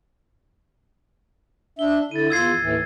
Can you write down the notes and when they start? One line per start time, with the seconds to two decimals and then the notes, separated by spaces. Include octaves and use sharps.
1.79 D4 E5 G7
2.11 D3 E4 A6 D#7
2.30 E2 F4 E6 G#6 C7
2.60 D#2 A2 E3